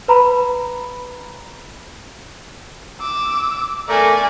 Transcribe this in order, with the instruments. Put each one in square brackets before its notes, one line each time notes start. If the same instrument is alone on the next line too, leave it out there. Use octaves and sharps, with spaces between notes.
[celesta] B4 A#5 B5
[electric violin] D6 E6
[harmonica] A3 A#4 [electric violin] D5 G#5